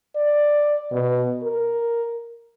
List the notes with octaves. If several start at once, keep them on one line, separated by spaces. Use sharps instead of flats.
D5
B2
A#4